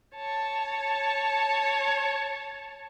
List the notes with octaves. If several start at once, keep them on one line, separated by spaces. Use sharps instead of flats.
C#5 A5